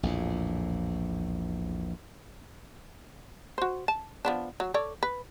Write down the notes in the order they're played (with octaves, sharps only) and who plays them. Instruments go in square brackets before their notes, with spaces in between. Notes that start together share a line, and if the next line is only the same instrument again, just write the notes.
[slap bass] A#1 E2 A2
[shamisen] F#4 C5
A5
F3 B3 D4
F#3
A4 C#5 D5
B4